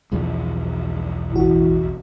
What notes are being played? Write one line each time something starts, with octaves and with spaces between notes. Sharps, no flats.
B1 E2 F3
A1 E3 F#4